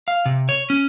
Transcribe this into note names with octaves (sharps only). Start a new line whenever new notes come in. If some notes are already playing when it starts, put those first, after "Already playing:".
F5
C3
C#5
C#4